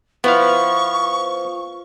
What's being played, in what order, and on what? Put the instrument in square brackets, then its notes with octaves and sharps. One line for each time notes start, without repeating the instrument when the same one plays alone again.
[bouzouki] F3 [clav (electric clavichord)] B3 E4 F5 [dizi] C#6